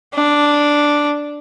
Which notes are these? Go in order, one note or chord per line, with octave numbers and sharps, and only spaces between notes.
D4